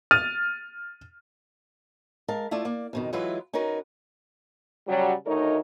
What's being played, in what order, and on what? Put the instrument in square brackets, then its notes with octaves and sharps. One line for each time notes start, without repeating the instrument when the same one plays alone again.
[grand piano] F6 A6 D#7
[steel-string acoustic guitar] G#3 A#4 F5 A5
A3 E4 F4 D5 A5
A#3 D5
F2 B2 D#3
E3 F#3 G#3 E4 F4 B4
C#4 D#4 F#4 A#4 B4
[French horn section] C#3 F#3 G3
D2 D#3 A3 D#4 A#4 C#5